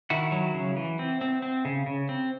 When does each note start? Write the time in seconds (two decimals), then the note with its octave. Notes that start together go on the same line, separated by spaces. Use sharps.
0.10 D#3 E4 F#4
0.32 F#3
0.54 C#3
0.76 E3
0.99 C4
1.21 C4
1.42 C4
1.65 C#3
1.86 C#3
2.09 C4